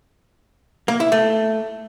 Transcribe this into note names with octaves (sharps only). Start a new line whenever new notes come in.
A#3
E4
A3